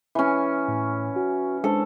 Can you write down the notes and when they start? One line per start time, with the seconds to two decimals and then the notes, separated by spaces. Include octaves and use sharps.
0.15 E3 C#4
0.68 A2
1.16 F#4
1.64 G#3 D4 A4 C5